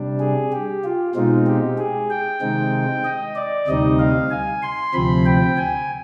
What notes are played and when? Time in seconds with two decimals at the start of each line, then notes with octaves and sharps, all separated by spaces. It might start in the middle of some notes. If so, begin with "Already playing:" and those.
Already playing: C3 G3 D4
0.20 G#4
0.52 G4
0.84 F4
1.15 B2 G#3 C4 D#4 F4
1.47 G4
1.78 G#4
2.10 G5
2.41 C3 D#3 G#3 C4 D#4
3.04 D#5
3.35 D5
3.67 D2 C3 G3 C4 D#4 D#5
3.99 F5
4.31 G#5
4.63 C6
4.94 D2 C3 F3 C4 B5
5.26 G5
5.57 G#5